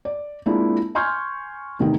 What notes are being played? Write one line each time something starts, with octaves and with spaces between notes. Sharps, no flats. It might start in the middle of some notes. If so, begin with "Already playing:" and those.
D5
G#3 A#3 C4 D4 E4 F4
G#5 C6 C#6 F6 G6 G#6
E2 C3 D#3 A3 D#4 G5